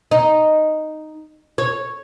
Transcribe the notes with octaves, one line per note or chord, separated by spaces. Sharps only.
D#4
C#5